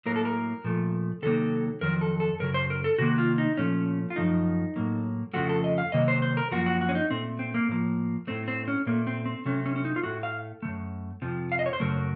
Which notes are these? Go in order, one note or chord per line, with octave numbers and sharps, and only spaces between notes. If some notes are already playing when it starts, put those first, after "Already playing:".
A2 F#3 A#3 A#4
A4
A#4
A#2 F3 A3
C3 D#3 F#3 A#3 A4
F2 D#3 F#3 A#4
A4
A4
F#2 C#3 F#3 A#4
C5
A#4
A4
C3 D#3 A#3 F#4
F4
D#4
A#2 F3 A3 C#4
F4
F#2 F3 A3 D#4
A2 F#3 A#3
F2 C#3 F3 A3 F#4
A4
D#5
F5
C3 D#3 F#3 A#3 D#5
C5
C5
A#4
F#2 F3 A#3 F#4
F#4
F#4
C#4
D#4
A#2 A3 C4
C4
A#3
A2 F3 A#3
A2 A3 C4
C4
C#4
A#2 A3 A#3
C4
C4
C3 F#3 A3 C#4
C#4
C#4
D#4
F4
A2 A3 F#4
F5
D#3 A3
F#2
F2 C3 F3
F5
D#5
C#5
C5
F#2 C#3 F#3 A3 A#4